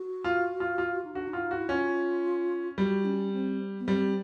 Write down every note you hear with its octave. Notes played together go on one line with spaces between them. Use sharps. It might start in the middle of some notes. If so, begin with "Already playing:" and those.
Already playing: F#4
F4
F4
F4
D#4
D4 F#4
D#4
E4 F4
D#4
F#4
E4
C#4 F4
G3 F#4
C#4
C4
B3
G3 C4